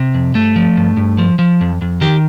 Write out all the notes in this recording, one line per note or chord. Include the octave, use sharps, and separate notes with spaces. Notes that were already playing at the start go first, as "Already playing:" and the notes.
Already playing: C3
F2
G2 A3
F3
G2
G2
F3
F3
F2
F2
D#3 G4